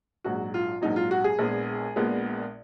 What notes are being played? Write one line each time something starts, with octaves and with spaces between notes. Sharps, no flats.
A#1 G#2 F#3 F#4
F4
A#1 G#2 F#3 D#4
F4
F#4
G#4
A#1 A#2 G#3 B3
A#1 A#2 G#3 B3